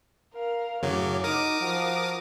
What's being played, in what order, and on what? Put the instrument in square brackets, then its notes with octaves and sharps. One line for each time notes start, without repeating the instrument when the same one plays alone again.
[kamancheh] A#4 F5
[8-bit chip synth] F#2 C#3 F#3 [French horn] A2 [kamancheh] C#5 D6
[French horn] D#4 [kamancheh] F#4 [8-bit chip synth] A#4 D6 D#6
[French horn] F3 [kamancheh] F#4